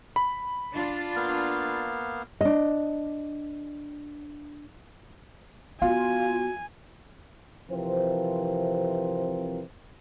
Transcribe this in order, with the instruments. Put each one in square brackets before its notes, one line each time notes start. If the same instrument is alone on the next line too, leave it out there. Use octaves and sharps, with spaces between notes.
[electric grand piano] B5
[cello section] D4 F4
[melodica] A#3 B3 F5
[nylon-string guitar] D4 D#5
[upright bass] B3 [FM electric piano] F4 [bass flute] F#4 [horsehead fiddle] G#5
[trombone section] C3 E3 F3 C4 A#4 C5